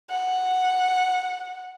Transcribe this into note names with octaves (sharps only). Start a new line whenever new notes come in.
F#5